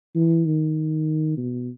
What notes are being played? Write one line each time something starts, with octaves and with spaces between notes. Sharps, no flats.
E3
D#3
B2